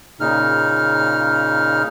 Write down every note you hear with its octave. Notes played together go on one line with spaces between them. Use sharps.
A#2 C#3 D#4 F6